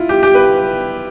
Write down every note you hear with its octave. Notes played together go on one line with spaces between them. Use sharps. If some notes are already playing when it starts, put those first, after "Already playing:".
Already playing: E4 F4
G4
G4
B4